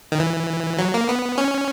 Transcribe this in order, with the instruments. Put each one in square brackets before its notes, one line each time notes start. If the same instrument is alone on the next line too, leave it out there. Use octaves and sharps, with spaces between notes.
[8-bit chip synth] D#3
E3
F#3
A#3
B3
C#4